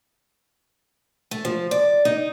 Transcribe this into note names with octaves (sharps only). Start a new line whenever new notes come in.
A3
F3
D5
D#4